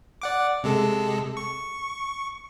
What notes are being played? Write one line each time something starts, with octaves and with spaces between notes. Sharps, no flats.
D5 F#5 D6
C3 G#3 A4
C#6